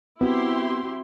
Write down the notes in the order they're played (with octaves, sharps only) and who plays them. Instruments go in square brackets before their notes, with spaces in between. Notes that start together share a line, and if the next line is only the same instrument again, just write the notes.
[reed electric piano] B3 [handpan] C4 F#4 [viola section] E4 G4 C6